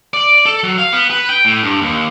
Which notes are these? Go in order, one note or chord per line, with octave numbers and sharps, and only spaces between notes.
D5
A4
F#3
F5
B3
B4
G5
A2
G2
D#2